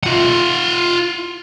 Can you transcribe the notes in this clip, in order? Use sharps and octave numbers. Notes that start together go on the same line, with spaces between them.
F4 F#5